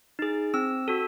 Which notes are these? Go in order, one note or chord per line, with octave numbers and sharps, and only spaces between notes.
D#4 G#4
C4 E6
F#4 A4